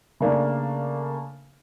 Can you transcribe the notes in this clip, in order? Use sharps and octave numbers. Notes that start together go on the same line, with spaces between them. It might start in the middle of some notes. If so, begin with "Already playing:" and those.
C#3 A3 A#3 D4